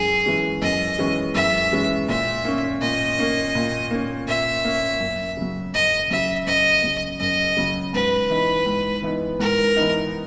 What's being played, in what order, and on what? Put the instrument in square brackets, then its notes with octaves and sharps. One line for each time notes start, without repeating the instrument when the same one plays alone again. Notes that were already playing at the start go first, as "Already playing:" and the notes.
Already playing: [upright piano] F#2 E3 G#3 C#4 [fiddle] G#4
[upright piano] E3 G#3 C#4
[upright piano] F#2 [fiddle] D#5
[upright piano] E3 G#3 C#4
[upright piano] F#2 [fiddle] E5
[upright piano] E3 G#3 C#4
[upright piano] A#2 [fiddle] E5
[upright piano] A#3 C#4
[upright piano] A#2 [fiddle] D#5
[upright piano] A#3 C#4
A#2
A#3 C#4
[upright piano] A#2 [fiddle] E5
[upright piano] A#3 C#4
F#2
C#3 F#3
[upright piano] F#2 [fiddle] D#5
[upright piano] C#3 F#3 [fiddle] E5
[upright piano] F#2 [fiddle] D#5
[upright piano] C#3 F#3
[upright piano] F#2 [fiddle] D#5
[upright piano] C#3 F#3
[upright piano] G#2 [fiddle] B4
[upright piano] E3 B3 D#4
G#2
E3 B3 D#4
[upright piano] G#2 [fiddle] A#4
[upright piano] E3 B3 D#4